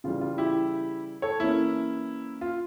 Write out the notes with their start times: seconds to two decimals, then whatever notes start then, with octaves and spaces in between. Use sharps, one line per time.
0.04 C#3 E3 G3 F4
0.21 F4
0.38 E4 G4
1.22 A4 C#5
1.40 E3 A#3 C#4 E4
2.41 F4